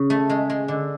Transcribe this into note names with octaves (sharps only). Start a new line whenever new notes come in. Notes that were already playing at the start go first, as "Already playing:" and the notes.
Already playing: C#3
A3
G#3
G#3
D3